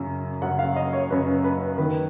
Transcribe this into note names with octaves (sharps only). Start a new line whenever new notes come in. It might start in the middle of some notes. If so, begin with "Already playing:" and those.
Already playing: F#2 C#3
F#2 C#3 F#5
F5
D#5
C#5
F#2 C#3 B4
B4
F#2 D#3 B4